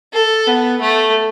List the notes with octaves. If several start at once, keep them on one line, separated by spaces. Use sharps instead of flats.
A4
B3
A3